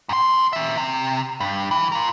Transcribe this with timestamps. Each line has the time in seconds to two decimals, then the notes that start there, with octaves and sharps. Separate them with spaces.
0.09 F#2 C6
0.53 A#2 E5
0.78 C3
1.40 G2
1.71 E3
1.92 F4 A#4